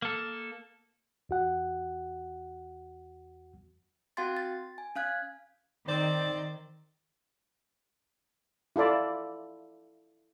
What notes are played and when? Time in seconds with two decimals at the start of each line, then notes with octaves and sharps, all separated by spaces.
0.02 A#3 A4
1.29 E2 F#4 F#5
4.17 C4 F#4 F5 G5 C6 A6
4.37 A6
4.78 G#5
4.96 C#4 F5 F#6 G#6
5.88 D#3 C4 C5 D5
8.76 E4 F4 A4 D5